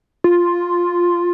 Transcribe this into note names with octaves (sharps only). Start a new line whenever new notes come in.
F4